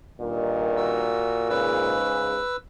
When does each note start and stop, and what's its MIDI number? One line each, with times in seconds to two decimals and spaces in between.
0.20 1.15 43
0.20 1.99 46
0.20 1.15 51
0.77 1.49 66
0.77 1.49 88
1.49 2.40 44
1.49 2.40 49
1.49 2.57 71
1.49 2.57 88